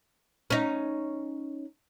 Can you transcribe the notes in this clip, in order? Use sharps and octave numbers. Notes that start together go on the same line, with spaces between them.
C#4 D#4